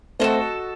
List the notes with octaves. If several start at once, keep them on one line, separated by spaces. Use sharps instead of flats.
A3 C4 F#4 A4 D#5